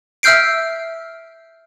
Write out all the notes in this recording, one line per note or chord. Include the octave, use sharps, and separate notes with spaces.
E5 E6 F6 G6 C7 D7